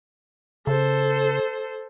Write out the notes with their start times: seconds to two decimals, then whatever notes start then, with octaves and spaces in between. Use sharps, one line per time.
0.67 C#3 A4 C5